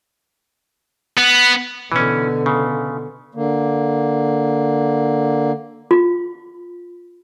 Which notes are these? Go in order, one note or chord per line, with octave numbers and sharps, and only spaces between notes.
B3
B2 D3 E3 C#4
C#3
D3 A#3
F4